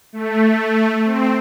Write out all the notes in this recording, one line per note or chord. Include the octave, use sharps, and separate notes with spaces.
A3
C4